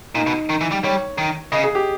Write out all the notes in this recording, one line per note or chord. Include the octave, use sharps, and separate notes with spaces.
A#2 D#4
B2
D#3
E3
G3
G3 C#5
D#3
C#3 D#5
G#4
G4